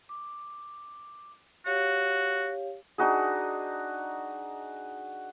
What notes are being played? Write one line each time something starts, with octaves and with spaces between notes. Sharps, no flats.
D6
F#4 G4 C#5 F5
D4 D#4 F#4 G#4